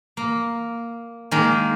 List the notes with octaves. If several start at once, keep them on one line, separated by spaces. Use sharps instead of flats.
A#3
D#3 G#3 A#3